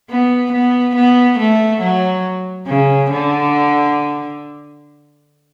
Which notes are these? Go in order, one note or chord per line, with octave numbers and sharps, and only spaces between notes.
B3
B3
B3
A3
F#3
C#3
D3